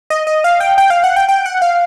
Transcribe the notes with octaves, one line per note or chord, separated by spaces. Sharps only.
D#5
D#5
F5
G5
G5
F5
F#5
G5
G5
F#5
F5